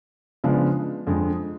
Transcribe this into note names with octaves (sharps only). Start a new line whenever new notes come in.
C#3 F3 G#3 B3 D4
F2 D3 G#3